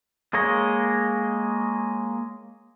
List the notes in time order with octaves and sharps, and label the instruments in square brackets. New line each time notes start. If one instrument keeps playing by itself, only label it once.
[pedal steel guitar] G#3 A#3 G#4 C#5 D#5